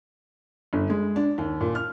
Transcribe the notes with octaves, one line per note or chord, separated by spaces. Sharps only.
G1
G#3
D4
D#2
A#2
F6